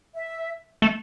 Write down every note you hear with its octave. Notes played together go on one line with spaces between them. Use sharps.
E5
A3